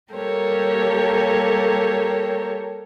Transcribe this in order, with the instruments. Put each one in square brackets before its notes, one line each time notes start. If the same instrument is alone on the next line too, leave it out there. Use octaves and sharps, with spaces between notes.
[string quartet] G3 A#3 G4 A4 A#4 C#5